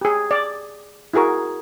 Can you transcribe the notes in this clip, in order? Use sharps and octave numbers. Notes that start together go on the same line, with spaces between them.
G4 G#4
D5
E4 F#4 G#4 A#4 C#6